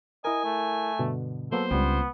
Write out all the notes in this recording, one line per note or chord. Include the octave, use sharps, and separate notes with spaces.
E4 A#4 D#5 G#5
A3
G2 B2 D3
F#3 A#3 B3 A4 C5
C#2 G3 G#3 B3 C4